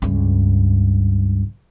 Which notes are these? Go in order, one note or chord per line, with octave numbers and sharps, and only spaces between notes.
C#2 G2